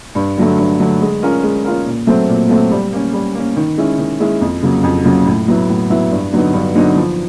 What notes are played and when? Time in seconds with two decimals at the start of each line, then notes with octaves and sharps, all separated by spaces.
0.15 G2
0.37 D3 F#3 A3
0.58 G2
0.79 D3 F#3 A3
1.01 G#3
1.23 C#4 F4 A#4
1.43 G#3
1.65 C#4 F4 A#4
1.85 A#2
2.07 F#3 A3 C4
2.28 A#2
2.50 F#3 A3 C4
2.71 G3
2.93 A#3 C#4
3.14 G3
3.35 A#3 C#4
3.56 D#3
3.78 G#3 C#4 E4
3.98 D#3
4.20 G#3 C#4 E4
4.41 F2
4.62 C#3 F#3 A#3
4.84 F2
5.05 C#3 F#3 A#3
5.26 A2
5.48 F#3 B3 E4
5.69 A2
5.90 F#3 B3 E4
6.11 G2
6.32 D3 F#3 B3 D#4
6.54 G2
6.75 D3 F#3 B3 D#4
6.96 F3